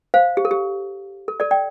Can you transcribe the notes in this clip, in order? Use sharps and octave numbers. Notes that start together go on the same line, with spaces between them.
C5 F5
G4
A4
G4
A4
A4 D5
D5 G5